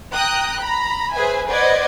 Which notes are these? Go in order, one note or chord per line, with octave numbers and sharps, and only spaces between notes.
G5 A#5 D#6 F#6
A#5 B5
G#4 B4 C5 E5 G#5
B4 C5 D5 D#5 F#5 G#6